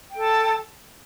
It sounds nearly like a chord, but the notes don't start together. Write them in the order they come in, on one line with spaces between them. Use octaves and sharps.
G5 A4 A5